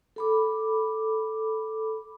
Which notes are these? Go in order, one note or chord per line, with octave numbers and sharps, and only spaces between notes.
A4 B5 D6